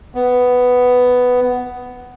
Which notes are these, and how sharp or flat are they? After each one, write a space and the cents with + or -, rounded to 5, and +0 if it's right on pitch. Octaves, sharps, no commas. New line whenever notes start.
B3 +5